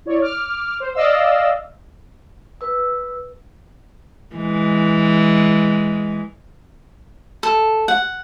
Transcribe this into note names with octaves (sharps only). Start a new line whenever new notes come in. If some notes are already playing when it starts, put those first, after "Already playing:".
E4 C#5 D5
D6 F6
C5
D5 D#5 F5 E6
B4 E6
E3 G#3
A4
F#5